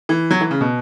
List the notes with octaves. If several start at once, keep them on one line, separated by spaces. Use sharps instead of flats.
E3
F#3
E3
C#3
B2